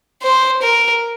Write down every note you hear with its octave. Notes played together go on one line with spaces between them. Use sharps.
C5
A#4